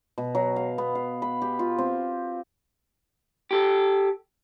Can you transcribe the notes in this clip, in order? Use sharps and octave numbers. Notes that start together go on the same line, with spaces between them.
B2
F#3
F5
B3
F5
B5
G4
F4
C4
G4 A4